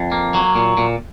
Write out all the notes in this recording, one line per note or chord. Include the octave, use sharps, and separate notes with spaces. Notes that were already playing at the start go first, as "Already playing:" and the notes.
Already playing: F2
A#3
F#3
A#2
A#2